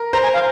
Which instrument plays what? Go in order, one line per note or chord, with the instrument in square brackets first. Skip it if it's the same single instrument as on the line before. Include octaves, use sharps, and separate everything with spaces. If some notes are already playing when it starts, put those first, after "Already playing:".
Already playing: [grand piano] A#4
[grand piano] C5 [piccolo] A#5
[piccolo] G#5
F5